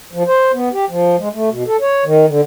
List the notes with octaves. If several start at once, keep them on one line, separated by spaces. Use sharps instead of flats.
F3
C5
B3
G4
F3
G#3
A3
B2
A4
C#5
D#3
D3